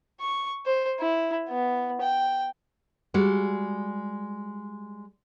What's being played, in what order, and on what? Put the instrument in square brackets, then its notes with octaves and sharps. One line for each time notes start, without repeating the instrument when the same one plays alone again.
[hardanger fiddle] C#6
C5
E4
B3
G5
[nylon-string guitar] G3 G#3 F#4